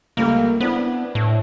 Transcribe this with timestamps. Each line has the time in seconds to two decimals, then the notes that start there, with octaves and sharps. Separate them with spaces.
0.17 C#2 G3 A3 A#3
0.61 B3 C4 D4 E4
1.15 A2